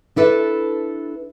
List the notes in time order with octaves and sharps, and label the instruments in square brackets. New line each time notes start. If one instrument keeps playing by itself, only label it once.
[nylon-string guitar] D4 E4 A4 B4 C#5 E5